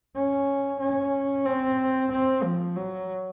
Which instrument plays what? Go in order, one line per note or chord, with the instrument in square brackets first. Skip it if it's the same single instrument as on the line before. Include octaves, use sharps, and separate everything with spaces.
[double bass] C#4
C#4
C4
C4
F3
F#3